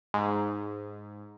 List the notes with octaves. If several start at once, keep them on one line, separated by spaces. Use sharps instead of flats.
G#2